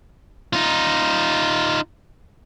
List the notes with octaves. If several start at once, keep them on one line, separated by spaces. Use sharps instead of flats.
D#4 F4